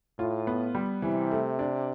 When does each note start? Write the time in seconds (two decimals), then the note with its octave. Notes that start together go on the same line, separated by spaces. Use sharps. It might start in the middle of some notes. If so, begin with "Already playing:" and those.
0.19 A2 F4
0.47 B3
0.75 G3
1.02 C3 E3
1.31 A3
1.59 D4